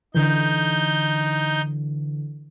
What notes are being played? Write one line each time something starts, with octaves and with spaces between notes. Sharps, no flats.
D3 E3 D#4 G6